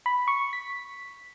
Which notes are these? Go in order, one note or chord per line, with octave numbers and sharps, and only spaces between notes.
B5
C#6
B6